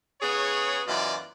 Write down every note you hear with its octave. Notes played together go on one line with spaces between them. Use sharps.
C#3 B3 G#4 C#5
F#2 B2 E3 F4 D5